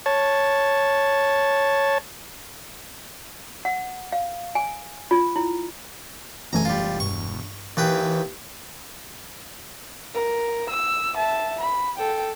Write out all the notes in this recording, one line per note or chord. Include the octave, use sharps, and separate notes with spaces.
C#5 A5
F#5
F5
G#5
F4
E4
E1 F#2 E3 A3 G#5 A#5
G3 F4
G2 C#6
D#2 E3 B4 G5
A#4
E6
E5 A5
B5
A4 G5